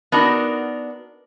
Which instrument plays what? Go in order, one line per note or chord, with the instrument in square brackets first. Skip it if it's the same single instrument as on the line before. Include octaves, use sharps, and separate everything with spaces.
[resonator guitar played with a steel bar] B3 D4 D#4 F#4 A#4